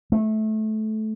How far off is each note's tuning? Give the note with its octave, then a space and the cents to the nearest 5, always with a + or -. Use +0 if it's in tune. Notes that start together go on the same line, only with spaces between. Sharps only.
A3 -20